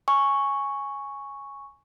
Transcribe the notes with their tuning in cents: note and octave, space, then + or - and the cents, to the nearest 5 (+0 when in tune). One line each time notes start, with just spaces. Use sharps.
G#5 +0 C#6 +0